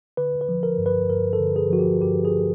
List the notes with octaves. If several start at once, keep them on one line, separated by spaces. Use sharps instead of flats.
D3 B4
B4
F3
A#4
G2
B4
G2 A#4
A4
D3
G#4
F3 F#4
G4
G2 G4
G#4